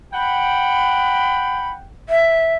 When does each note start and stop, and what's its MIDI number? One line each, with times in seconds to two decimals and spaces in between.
0.14 1.88 78
0.14 1.88 79
0.14 1.70 83
2.09 2.56 76